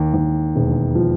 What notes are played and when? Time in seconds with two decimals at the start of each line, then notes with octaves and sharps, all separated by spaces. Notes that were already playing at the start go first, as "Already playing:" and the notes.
Already playing: D#2
0.14 D#2
0.55 E1
0.95 F3